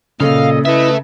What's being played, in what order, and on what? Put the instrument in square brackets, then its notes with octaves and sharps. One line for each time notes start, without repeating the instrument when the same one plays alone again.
[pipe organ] A#2 D#5 [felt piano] C#3 [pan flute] A4 [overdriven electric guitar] F5
[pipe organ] E4 D#5 [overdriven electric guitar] A4 E5 [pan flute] B4